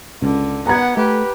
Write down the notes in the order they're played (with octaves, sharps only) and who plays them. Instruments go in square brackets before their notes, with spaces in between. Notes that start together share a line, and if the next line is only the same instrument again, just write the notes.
[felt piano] C#2 [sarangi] D3
[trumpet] B3 [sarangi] F#5 [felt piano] A#5 G#6
[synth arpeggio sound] A3 [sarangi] G4 [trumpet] B4